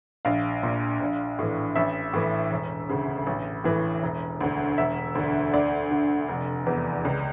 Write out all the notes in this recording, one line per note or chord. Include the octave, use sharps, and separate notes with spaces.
A#1 F5
A#2
A#1
A2 E3
A1 E5
A2 E3
E1
D2 C#3
A1
A2 E3
E1
D2 D3
E1 E5
D2 D3
D2 D5
D3
F1
E2 E3
C#2